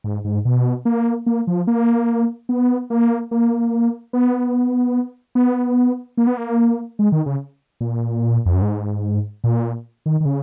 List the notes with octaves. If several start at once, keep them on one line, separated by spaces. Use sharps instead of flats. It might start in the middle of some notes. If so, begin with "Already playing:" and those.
G#2
G#2
B2
A#3
A#3
F3
A#3
B3
A#3
A#3
B3
B3
A#3
B3
A#3
G#3
D#3
C#3
A#2
F2
F#2
G#2
A#2
D#3
D#3
C#3